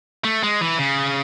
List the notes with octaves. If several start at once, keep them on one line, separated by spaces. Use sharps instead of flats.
A3
G#3
E3
C#3